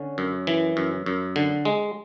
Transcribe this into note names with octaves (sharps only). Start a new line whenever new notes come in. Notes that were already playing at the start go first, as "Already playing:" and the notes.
Already playing: D3 C#4
F#2
E3
F#2
F#2
D3
G#3